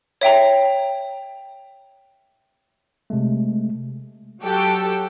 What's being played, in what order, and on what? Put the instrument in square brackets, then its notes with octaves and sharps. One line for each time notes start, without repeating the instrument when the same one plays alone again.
[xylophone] C#5 E5 G5 A#5
[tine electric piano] C3 G#3 A3
[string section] F#3 F#4 G4 A4 G5